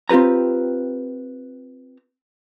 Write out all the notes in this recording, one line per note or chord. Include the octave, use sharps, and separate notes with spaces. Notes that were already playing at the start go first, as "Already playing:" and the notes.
C4 F4 G4 B4 A#5